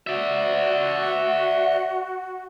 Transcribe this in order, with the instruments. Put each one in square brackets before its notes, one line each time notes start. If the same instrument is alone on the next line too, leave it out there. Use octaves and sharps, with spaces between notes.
[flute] F#4 [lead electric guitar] D5 E5